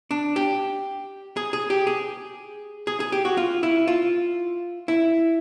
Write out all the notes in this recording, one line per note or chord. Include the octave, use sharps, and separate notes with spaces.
D4
G4
G#4
G#4
G4
G#4
G#4
G#4
G4
F#4
F4
E4
F4
E4